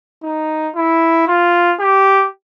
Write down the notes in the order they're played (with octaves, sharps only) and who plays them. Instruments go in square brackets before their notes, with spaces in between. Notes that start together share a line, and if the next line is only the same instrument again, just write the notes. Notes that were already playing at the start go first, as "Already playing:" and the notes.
[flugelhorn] D#4
E4
F4
G4